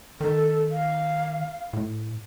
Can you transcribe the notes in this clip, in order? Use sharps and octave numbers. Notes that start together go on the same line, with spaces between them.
D#3 A4
F5
A2